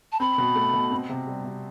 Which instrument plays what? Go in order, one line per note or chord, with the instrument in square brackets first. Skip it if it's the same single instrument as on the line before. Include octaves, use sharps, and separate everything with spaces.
[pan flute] A5
[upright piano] C4 [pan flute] B5
[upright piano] B2
A3
B2
C4
C3
G3
C3